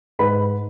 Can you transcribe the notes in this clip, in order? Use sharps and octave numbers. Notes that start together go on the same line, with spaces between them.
G#2 B4 B5